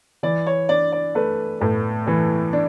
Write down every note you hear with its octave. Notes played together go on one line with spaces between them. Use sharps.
E3 D5
C#5
D4 D5
D5
A3 B4
A2 B4
E3 B4
D4